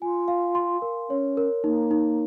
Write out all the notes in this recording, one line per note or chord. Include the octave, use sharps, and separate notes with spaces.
F4 G#5
F5
C6
A#4
C#4 C#5
A#4
A#3 D#4
D#4